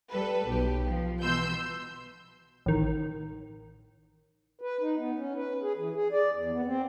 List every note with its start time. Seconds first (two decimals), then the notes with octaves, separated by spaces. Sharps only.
0.11 G3 A4 B4
0.46 B1 G4
0.85 F3
1.21 B2 E3 C6 E6 G6
2.66 A1 D#3
4.61 B4
4.81 D#4
4.97 B3
5.17 C#4
5.36 B4
5.63 G#4
5.77 E3
5.94 G#4
6.12 D5
6.35 E2
6.53 B3
6.66 C4